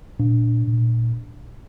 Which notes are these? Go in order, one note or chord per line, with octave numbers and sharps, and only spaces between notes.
A#2 D4
A#2